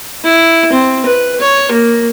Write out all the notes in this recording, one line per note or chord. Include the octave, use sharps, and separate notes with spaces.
E4
C4
B4
C#5
A#3